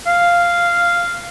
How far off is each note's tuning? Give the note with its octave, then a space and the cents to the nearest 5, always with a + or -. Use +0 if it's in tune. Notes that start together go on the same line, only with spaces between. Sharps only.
F5 -5